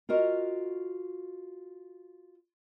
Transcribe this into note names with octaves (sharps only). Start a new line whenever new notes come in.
F4 F#4 A#4 D#5